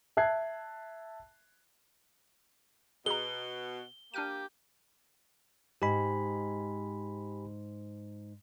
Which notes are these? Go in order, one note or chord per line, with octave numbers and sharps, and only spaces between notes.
E5 A5 F#6 G#6 C7
B2 G#4 A#5 G7
A#3 D4 G4 F6 D#7
G#2 G4 G#5 B5